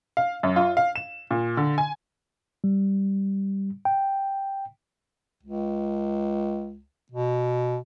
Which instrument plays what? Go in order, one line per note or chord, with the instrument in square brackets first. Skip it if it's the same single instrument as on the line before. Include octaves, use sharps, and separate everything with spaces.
[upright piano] F5
F#2
F4
F5
E7
A#2
D3
G#5
[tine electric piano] G3
G5
[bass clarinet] C#2
B2